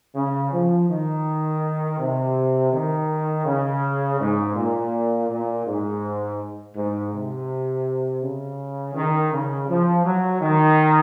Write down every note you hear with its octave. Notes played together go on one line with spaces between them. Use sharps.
C#3
F3
D#3
C3
D#3
C#3
G#2
A#2
A#2
G#2
G#2
C3
C#3
D#3
C#3
F3
F#3
D#3